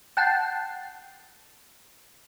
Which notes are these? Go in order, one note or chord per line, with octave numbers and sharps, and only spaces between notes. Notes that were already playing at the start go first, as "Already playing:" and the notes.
F#5 G5 A5 C7